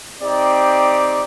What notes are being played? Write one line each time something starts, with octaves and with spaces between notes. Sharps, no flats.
C4 D#4 G4 D5